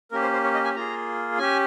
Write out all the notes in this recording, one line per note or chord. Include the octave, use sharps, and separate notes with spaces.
A#3 C#4 G4 A#4
C5
C5
C#5
D#5
G#5
A#3 F4 G#4 A#5
C#4 G4 G#5